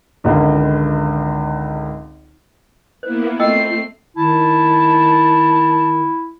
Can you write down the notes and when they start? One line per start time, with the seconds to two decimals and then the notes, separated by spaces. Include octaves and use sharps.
0.24 G#1 C#2 D3 F4
3.03 A#3 B3 E4 C5
3.39 A3 C4 F4 D#5 G5 E6 C7
4.17 D#3 E4 A5